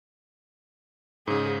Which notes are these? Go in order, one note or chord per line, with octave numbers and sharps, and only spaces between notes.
G#2 C#3 G#4